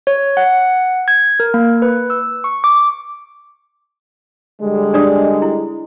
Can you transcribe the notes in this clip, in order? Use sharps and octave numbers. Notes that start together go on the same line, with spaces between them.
C#5
F#5
G#6
A#4
A#3
B4
E6
C#6
D6
D3 G3 G#3
D4 D5 D#6
E4